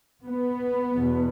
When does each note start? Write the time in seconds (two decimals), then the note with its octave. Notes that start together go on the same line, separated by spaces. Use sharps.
0.27 B3
0.95 E2 B2